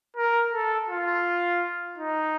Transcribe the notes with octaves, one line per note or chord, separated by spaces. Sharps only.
A#4
A4
F4
D#4